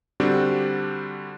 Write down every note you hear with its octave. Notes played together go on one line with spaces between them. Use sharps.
D3 G3 C4 D4 F#4 G4